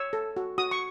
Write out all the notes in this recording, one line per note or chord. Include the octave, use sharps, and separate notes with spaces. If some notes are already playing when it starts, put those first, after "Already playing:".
Already playing: C#5 E6
A4
F#4
F#4 D#6
C#6